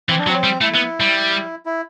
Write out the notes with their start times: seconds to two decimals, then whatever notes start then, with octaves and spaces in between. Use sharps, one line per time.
0.09 E3 C4
0.19 D4
0.27 F#3 C4
0.44 G3
0.61 A3 E4
0.75 B3
1.00 G3
1.66 E4